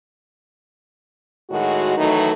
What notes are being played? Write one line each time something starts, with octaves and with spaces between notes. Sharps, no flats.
A2 D#3 G#3 F#4
D#3 E3 F#3 A3 D#4